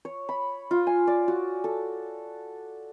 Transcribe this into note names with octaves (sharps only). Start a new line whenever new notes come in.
C#5
B5
F4
G#5
D5
F#4
A4